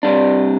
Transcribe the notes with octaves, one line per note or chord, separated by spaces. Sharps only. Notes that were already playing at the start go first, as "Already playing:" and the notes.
C3 G3 D4